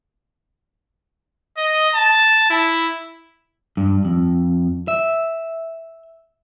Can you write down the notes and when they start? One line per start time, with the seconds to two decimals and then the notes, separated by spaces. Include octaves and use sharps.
1.58 D#5
1.94 A5
2.50 E4
3.77 G2
4.05 F2
4.88 E5